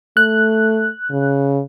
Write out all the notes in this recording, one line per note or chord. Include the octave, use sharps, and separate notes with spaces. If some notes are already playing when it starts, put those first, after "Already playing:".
A3 F#6
C#3